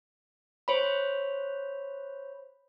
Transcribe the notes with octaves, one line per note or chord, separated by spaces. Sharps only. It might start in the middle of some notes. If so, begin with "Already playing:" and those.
C5 C#5 B5